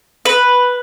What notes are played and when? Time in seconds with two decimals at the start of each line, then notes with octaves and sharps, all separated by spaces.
0.25 B4